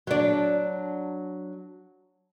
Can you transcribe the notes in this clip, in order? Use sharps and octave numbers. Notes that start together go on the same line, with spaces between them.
F#3 D4